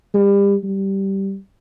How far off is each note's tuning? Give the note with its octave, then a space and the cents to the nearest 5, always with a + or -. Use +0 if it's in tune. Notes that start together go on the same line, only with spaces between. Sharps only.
G3 +30
G3 -10